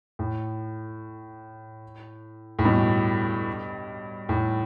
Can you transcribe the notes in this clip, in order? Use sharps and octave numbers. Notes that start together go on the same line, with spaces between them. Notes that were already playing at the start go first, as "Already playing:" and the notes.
A2
A2
G2 B2
A2